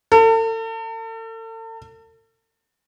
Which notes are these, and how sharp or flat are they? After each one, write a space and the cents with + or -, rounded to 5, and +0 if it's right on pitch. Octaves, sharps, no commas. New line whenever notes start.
A4 +40